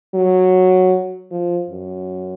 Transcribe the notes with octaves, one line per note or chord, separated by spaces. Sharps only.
F#3
F3
F#2